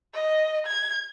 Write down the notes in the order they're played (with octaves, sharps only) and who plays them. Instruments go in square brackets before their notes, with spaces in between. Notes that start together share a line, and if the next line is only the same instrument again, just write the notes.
[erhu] D#5
G#6